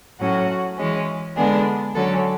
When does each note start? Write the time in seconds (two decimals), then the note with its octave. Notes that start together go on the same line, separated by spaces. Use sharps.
0.19 A2 F#3 C#4 F#4
0.78 E3 G#3 C#4
1.36 D3 G#3 B3 D4 G#4
1.95 D3 F#3 C#4 A4